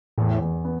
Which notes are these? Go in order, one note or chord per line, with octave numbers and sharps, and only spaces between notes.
E2 A2
E2
B3